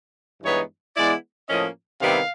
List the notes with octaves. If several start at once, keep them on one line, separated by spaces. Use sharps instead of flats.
G2 E3 G#3 B3 D#4 C#5
E3 G#3 B3 E4 D5
A2 F3 A#3 C#4 D#5
C3 D#3 G3 B3 E4 F5